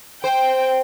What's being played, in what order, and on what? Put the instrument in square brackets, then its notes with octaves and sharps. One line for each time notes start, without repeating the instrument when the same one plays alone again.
[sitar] C5 [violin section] G5